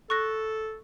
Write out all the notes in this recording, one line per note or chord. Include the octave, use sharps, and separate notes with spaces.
A4 C#6 F#6 A#6